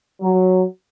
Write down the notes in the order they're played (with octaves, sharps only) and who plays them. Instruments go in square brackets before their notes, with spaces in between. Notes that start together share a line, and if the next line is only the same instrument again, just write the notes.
[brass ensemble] F#3